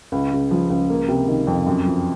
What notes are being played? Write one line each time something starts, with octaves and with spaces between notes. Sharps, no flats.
C#2
C#3
F3
C#2
A#3
C3
D#3
F2
F#2
F3